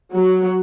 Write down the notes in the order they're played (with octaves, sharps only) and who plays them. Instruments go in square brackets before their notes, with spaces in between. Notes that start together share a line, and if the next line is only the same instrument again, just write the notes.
[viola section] F#3